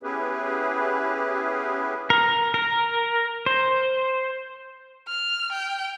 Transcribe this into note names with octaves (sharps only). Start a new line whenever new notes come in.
B3 C#4 E4 G4 G#4 B4
A#4
A#4
C5
F6
G5